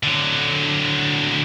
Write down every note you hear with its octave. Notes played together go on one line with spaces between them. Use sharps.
D3 F#3